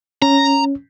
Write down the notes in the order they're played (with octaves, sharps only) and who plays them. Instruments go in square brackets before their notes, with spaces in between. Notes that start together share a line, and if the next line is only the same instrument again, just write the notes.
[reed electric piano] C#4 [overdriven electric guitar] A#5